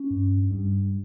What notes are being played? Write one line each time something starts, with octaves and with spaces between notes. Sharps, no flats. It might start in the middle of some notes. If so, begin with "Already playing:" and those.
Already playing: C#4
G2
G2